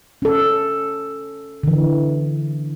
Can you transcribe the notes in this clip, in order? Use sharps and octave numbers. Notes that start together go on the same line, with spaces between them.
C#4 A4
D3 E3